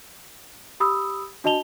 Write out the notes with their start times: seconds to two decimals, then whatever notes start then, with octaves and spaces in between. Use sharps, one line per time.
0.80 G4 B5 D#6 E6
1.44 D4 F#4 D#5 A5 F7 G7